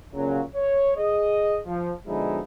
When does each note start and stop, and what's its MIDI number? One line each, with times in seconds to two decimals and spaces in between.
0.15 0.42 46
0.15 0.42 49
0.15 0.42 54
0.55 0.93 73
0.97 1.58 68
0.97 1.58 75
1.66 1.91 53
2.08 2.40 47
2.08 2.40 50
2.08 2.40 53
2.08 2.40 56
2.08 2.40 63
2.08 2.40 64